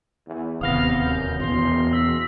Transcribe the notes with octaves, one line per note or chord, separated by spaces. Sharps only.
E2
D1 D#2 C3 B3 F5 D#6 F6 A#6
F#2 G6
F#1 E2 B2 C6
E6 B6